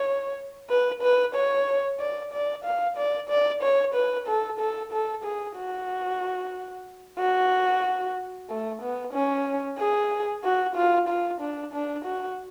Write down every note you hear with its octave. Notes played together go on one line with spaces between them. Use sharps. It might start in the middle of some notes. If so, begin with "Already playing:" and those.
Already playing: C#5
B4
B4
C#5
D5
D5
F5
D5
D5
C#5
B4
A4
A4
A4
G#4
F#4
F#4
A3
B3
C#4
G#4
F#4
F4
F4
D4
D4
F#4